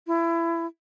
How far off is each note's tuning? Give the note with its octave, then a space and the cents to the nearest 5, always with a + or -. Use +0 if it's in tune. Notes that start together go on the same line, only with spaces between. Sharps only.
E4 +25